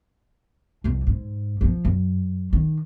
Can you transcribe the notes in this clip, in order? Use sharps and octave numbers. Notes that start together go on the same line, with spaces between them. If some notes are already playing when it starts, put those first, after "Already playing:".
C2 F2
G#2
E3 F3
F#2
D#3